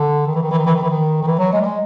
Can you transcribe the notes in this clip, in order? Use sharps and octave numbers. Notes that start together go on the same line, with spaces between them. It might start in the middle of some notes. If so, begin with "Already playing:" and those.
Already playing: D3
D#3
E3
D#3
E3
D#3
E3
D#3
E3
D#3
D#3
E3
F#3
G#3
G3
G#3